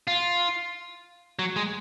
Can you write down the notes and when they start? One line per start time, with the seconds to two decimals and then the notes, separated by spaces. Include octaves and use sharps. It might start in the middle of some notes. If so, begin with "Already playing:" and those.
0.07 F4
1.39 F#3
1.56 G#3